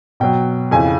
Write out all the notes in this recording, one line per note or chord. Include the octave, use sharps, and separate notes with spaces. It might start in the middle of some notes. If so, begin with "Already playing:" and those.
B2 F#3 G5
F2 C#3 E3 G#5